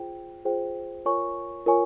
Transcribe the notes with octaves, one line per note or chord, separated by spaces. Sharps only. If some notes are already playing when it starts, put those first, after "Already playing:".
Already playing: F4 G#4 C5 G5
F4 G#4 C5 G5
F4 A#4 C#5 G#5 C#6
F4 A#4 C#5 G#5 C#6